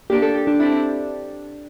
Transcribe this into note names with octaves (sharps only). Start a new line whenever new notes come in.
A#3 D4 G4
A4
G4
D4
C4 D4 E4